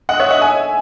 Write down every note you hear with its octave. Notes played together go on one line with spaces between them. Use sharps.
D#5 F#5
C#5 E5
D#5 F#5
E5 G#5